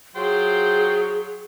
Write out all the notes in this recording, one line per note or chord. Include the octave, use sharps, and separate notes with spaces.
F#3 F4 G#4 C5 G5